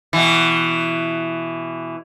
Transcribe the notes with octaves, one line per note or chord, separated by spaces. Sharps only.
B2 E3